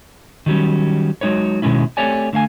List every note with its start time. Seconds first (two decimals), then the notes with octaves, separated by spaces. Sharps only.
0.46 D#3 F#3 G3 C#4
1.21 F#3 G#3 D#4 B4 C#5
1.62 B2 D#3 G#3 C#4 E4
1.97 A3 C4 G4 C#5 D5 G#5
2.33 D3 A3 F5 G#5